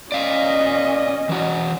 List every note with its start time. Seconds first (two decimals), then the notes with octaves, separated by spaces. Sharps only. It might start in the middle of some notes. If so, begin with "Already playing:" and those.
0.12 C#4 D5 D#5 F5
1.29 E3 F#4